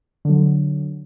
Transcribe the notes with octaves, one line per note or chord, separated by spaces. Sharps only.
D3 F#3